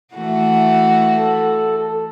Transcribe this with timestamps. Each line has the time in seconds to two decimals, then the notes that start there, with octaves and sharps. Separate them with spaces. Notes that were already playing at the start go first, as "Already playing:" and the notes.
0.14 E3 A3 F#4
1.16 A4